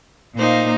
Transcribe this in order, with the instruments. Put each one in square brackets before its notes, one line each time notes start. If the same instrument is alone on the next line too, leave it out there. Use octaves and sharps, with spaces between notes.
[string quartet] A#2 A#3 D#4 C5 F5